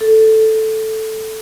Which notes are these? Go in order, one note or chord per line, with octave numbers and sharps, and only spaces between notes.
A4